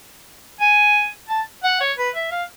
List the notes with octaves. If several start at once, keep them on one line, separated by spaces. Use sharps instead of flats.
G#5
A5
F#5
C#5
B4
E5
F5